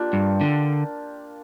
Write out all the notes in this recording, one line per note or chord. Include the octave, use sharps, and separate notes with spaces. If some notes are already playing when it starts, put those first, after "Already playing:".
Already playing: A#3 D4 F4 G4
G2
D3